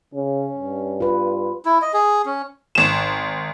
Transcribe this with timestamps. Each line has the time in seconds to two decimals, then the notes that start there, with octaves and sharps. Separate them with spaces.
0.14 C#3 C#4
0.56 G2
1.00 F4 B4
1.65 E4
1.82 D#5
1.94 G#4
2.26 C#4
2.75 G#1 E7